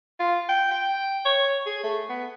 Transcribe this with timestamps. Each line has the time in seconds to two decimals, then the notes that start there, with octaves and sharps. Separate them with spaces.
0.20 F4
0.49 G5
0.71 G5
1.26 C#5
1.66 G#4
1.84 A3
2.09 B3